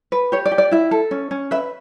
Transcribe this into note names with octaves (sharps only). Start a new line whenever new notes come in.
B4
G4 C#5
D5
G4
D5
E4 E5
A4
C#4
C#4
B4 E5